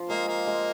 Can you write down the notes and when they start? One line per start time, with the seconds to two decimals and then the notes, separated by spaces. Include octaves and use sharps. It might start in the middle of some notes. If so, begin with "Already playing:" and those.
Already playing: F3
0.09 G#3 A#3
0.28 A#3
0.47 G#3